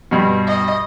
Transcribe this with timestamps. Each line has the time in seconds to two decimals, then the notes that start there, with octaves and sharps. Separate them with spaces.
0.11 G2 B2
0.47 D#5